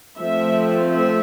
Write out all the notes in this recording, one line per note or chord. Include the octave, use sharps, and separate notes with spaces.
F3 A3 C4 E5
E5